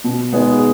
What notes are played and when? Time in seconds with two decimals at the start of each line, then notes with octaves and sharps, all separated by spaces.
0.04 B2
0.33 G#3 B3 D#4 G#4